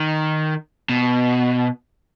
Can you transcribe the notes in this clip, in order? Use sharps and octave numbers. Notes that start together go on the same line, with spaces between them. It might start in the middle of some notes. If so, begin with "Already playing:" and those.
Already playing: D#3
B2